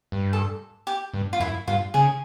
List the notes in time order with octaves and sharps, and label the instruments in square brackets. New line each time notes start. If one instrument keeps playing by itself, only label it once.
[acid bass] G2
[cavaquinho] A4
G4
[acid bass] G2
[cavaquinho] F4
[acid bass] F#2 [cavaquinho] E4
[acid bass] G2 [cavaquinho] F4
[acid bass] C#3 [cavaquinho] G#4